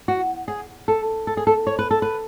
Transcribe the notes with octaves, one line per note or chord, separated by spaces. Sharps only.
F#4
G#4
A4
A4
G#4
A4
C#5
B4
A4
B4